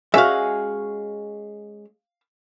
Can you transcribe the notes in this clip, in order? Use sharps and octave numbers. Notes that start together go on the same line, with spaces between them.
G#3 C#4 F#4 E5 F5